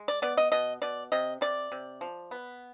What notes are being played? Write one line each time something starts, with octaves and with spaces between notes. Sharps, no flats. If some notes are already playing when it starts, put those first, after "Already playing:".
Already playing: G#3
D5
B3 D5
D#5
B2 D#5
B2 D5
C3 D#5
C3 D5
C3
F3
B3